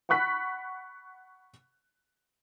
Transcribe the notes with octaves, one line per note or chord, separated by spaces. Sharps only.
F#5 B5 C#6 F#6 B6